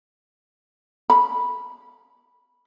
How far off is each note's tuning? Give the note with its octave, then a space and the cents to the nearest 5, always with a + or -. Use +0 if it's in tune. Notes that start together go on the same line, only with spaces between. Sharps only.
B5 -10